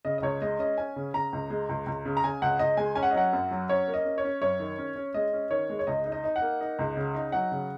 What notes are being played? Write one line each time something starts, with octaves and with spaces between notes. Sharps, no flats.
C#3 D#5
D#5
C#2 C#5
G#3 D#5
C#4 D#5
C#4 G#5
C#3
C#3 A#5
C#2
G#3
C#2
C#2
C#3
A#5
C#3 G#5
C#2 F#5
C#2 D#5
G#3 G#5
C#4 G#5
F#5
D#5
F#3 F#5
F#2
F#3
C#4 C#5
A#3
D#5
C#4
C#5
C#4
F#2 C#5
D#3
C#4
C#4
G#3 D#5
C#4
D#3 C#5
G#3
C#5
C#2 D#5
D#4
D#5
D#4
F#5
A#3
D#4
C#2
C#3
D#4
F#3 F#5
C#3